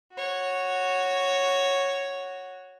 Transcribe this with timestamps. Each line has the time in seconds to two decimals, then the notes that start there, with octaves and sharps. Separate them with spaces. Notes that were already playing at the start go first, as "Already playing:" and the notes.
0.13 F#4 C#5